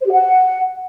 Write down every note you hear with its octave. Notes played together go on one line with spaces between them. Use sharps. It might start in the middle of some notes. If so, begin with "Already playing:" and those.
C5
G4
F#5